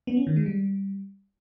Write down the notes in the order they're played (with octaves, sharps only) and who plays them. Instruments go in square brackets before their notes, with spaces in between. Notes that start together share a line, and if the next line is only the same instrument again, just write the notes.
[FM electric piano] B3
C#4
D#3
G#3
G3